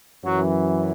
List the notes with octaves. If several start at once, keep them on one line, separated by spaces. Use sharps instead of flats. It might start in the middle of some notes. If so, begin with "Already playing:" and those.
F#2 E3 F#3